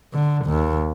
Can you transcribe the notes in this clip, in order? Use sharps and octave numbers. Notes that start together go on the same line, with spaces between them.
D3
D#2